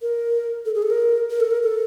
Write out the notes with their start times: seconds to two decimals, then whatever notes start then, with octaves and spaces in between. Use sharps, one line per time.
0.02 A#4
0.65 A4
0.75 G#4
0.82 A4
0.90 A#4
1.30 A#4
1.40 A4
1.51 A#4
1.63 A4